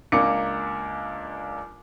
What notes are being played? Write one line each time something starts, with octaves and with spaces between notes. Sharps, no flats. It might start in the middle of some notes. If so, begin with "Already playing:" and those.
C#2 A#3 D4 D6 C#7